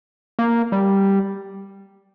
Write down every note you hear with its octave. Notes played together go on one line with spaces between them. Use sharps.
A#3
G3